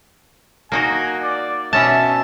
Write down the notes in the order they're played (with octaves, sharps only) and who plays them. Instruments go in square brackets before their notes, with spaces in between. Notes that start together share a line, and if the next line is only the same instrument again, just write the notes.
[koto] A#3 D#4 F#4 [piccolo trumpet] G#5
[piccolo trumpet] D5
[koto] B2 C#4 A5 [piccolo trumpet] E5